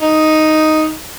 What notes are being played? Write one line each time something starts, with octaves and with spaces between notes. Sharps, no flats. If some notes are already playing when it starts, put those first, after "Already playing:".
D#4